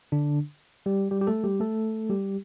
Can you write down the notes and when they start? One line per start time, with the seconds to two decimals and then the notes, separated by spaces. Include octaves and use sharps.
0.12 D3 D4
0.86 G3 G4
1.11 G3 G4
1.21 G4
1.27 A3 A4
1.44 G3 G4
1.60 A3 A4
2.10 G3 G4